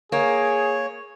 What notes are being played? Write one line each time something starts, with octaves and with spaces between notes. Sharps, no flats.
A#3 G#4 C#5